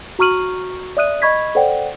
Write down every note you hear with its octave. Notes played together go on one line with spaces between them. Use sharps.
F#4 A#5 C#6 F6 D#7 F#7
D5 E5 D#6 F#6 D#7
D#5 B5 C#6 G#6 B6
A4 C5 D5 F#5 G5